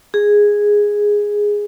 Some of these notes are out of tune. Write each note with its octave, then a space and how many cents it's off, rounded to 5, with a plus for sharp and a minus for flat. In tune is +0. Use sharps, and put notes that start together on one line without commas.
G#4 -5